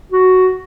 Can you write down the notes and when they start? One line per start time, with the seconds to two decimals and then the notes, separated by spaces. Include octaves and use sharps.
0.12 F#4